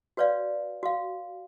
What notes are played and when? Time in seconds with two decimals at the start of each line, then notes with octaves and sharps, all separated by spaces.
0.17 F#4 B4 C#5 D5 F5
0.83 F#4 F5